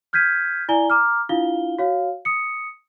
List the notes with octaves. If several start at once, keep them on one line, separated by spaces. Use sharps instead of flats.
F6 G6 G#6 B6 D#7
E4 D5 G#5 A#5 G7
A#5 D6 F6
D4 E4 F4 F5 G7
F#4 C#5 F5
D#6 C#7